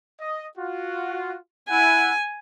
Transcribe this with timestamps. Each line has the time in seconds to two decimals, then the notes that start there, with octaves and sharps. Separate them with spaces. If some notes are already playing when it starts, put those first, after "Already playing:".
0.21 D#5
0.58 F4 F#4
1.70 E4 F#5 G#5